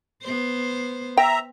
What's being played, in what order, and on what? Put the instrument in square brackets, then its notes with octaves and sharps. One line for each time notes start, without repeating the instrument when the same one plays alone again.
[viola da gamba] B3 C5
[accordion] E5 A#5 [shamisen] G5